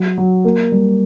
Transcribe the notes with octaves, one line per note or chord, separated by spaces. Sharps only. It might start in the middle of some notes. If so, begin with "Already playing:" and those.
Already playing: F#3
F#3
A#3
G3